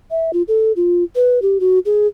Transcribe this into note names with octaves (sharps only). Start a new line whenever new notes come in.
E5
F4
A4
F4
B4
G4
F#4
G#4